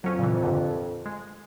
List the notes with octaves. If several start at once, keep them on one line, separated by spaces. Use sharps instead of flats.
F2 F#3 C#4
A#2 C#3 E3
G2 A#2 D3
G#3